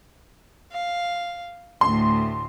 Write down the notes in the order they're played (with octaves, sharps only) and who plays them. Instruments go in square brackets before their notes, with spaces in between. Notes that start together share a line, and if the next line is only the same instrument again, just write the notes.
[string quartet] F5
[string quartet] D2 A2 [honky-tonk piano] C6